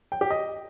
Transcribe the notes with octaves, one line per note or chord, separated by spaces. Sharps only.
G5
G4
D#5